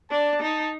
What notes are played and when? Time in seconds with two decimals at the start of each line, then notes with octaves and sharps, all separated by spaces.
0.11 D4 A5
0.42 D#4 A5